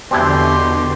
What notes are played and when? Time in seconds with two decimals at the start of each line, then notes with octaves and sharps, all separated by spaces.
0.11 E2 B2 D3 C4 D4 E4 G4 C6